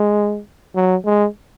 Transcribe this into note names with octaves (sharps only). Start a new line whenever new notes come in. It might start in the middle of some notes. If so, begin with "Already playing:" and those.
Already playing: G#3
F#3
G#3